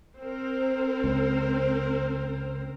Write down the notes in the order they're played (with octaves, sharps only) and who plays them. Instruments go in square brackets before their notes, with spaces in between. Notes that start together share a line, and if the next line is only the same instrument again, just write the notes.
[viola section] C4 A#4 C5
[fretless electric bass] C#2